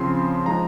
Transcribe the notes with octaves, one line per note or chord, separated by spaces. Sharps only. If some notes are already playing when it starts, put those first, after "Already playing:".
Already playing: C#3 F3 C4 C6
F3 G#3 C4 D#4 A#5